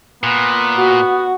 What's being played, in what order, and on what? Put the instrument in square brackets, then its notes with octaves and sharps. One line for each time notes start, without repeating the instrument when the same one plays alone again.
[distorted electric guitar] A#2 [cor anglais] B3
[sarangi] F#4